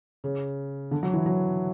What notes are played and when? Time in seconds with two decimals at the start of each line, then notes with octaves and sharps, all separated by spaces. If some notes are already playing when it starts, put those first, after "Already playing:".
0.24 C#3
0.91 D3
1.03 F#3
1.14 E3
1.26 F#3